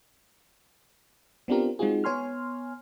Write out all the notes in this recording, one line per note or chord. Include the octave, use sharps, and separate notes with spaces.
B3 C4 D4 F4 G4 A#4
G#3 C4 D#4 F4 F#4 G#4
B3 C#5 G#5 C6 F6